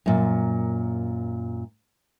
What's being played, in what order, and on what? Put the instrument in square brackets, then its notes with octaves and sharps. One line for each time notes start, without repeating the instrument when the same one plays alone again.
[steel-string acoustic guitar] F#2 A#2